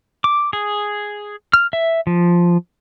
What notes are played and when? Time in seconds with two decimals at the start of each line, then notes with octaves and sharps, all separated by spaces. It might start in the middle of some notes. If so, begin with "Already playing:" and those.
0.24 D6
0.53 G#4
1.53 F6
1.73 E5
2.07 F3